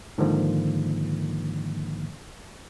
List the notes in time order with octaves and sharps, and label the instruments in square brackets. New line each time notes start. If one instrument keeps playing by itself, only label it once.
[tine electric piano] G#2 D3 D#3 F3 A#3